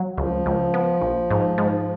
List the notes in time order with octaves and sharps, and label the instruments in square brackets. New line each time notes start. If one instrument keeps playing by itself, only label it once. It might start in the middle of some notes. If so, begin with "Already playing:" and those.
Already playing: [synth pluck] F#3
[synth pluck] C#2 [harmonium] F3
[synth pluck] C#2
B3
A#1
G#2
G#2